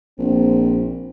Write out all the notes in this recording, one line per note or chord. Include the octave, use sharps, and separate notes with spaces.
A#1 C4